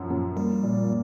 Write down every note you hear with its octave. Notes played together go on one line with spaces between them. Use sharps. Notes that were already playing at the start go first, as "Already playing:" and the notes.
Already playing: F#2 F3
F#2
G3 A#3
A#2